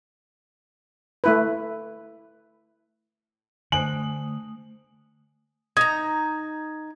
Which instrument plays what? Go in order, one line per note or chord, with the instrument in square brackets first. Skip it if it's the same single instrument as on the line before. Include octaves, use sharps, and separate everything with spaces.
[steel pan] A3 E4 B4
[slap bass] D3 [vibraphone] A3 D#6 [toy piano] C5 G#5 [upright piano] F#7
[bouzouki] D#4 A#5 [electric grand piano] G#6